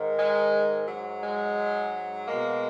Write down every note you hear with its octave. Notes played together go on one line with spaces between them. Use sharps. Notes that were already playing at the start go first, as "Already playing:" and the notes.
Already playing: G#2 D#3
G#3
G#2 F#3
G#3
B2 G#3 A#3